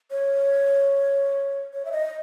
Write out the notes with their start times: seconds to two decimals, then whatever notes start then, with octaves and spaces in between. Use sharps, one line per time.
0.11 C#5
1.74 C#5
1.85 E5
1.92 D#5